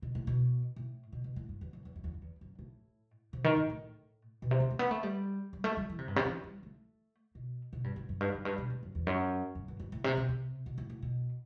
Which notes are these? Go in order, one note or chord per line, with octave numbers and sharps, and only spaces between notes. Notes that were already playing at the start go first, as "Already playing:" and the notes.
B2
A2
B2
A2
B2
B2
A2
G2
E2
F#2
E2
F#2
E2
F#2
E2
F#2
A2
C3
D#3
A2
A2
B2
C3
B3
A3
B3
A3
G3
G3
A3
G3
E3
C3
G2
C3
E3
G3
A3
B2
B2
G2
G2
F#2
G2
F#2
G2
B2
A2
F#2
E2
F#2
F#2
G2
G2
A2
C3
B2
C3
B2
A2
A2
B2